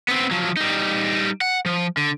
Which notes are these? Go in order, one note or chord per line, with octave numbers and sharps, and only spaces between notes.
B3 C4
F3 F#3
G3 D#4
F#5
F3
D3